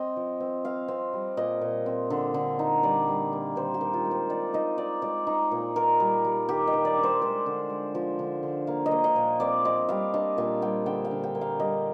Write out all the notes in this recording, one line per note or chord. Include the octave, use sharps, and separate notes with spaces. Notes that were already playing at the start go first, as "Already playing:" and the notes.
Already playing: C4 D#5
F3
C4
C4 F5
C4
G3
A#2 D#5
A#2
C4
D3
D3
D#4
G3 D5
G3
A#3
D#3 C5
G4
D#3
F4
G#3
C5
D#4 D5
D#4 D#5
D#4 D5
G#3 D5
D#4
A#2
F4 A#4
G3
G3
D#3 G4
D#5
D#3
D5
D4
C5
G#3 C5
D3
G#3
F3
D3
D3
A#3 F5
D#5
A#3
D#5
A#2
C4 D5
C4 D#5
G3 F5
D4 D#5
A#2 F5
G3 G5
D3 G5
F5
D3
G5
A#3
F5
G3 D#5